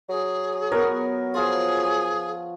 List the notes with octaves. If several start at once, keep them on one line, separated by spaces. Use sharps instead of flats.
F#3 G#4
B3 A#4 B4 C#5
F3 F4 G#4